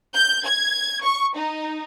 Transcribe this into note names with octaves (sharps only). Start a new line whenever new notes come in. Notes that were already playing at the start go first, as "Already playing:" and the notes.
G6
G#6
C#6
D#4